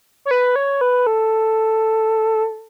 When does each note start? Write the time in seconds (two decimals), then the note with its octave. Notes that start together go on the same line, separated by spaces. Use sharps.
0.25 C#5
0.31 B4
0.56 C#5
0.81 B4
1.07 A4